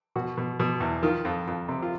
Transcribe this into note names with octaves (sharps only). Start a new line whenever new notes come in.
B2 F#4
B2
B2
E2
D#3 F4
F2
F2
C3
F4